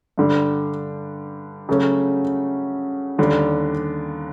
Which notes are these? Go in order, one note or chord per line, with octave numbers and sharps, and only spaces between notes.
G2 D3 G3
C#3 F#3 A3 C#4
D#2 D3 G3